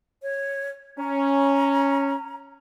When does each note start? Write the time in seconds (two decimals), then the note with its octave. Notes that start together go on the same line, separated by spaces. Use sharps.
0.22 C#5
0.98 C#4 A#5